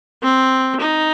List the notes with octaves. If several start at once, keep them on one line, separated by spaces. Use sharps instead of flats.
C4
D#4